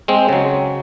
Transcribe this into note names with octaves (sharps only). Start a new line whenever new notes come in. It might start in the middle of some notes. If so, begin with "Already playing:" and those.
G#3 C4
C#3 F#3